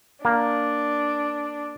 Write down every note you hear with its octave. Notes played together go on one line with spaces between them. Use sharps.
A#3 D4